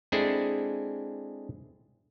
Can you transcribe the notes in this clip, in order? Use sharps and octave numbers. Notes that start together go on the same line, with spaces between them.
G#3 C4 D4 E4 G#4 A4